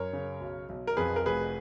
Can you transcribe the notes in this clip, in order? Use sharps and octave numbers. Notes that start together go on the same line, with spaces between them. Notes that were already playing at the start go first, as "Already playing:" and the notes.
Already playing: F#2 A#4 C#5
C#3
B1
B1
A#4
F2 G#4 B4
A#4
F1 G#4 B4